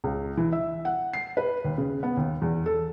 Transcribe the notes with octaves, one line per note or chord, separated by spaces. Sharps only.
C#2
E3
E5
F#5
C7
B4
D#2
C#3
B3
D#2
E2
A4